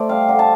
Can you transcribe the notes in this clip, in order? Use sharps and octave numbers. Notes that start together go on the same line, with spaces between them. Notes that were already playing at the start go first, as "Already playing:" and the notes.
Already playing: A3 C5 D5
G3 F5
D3
A5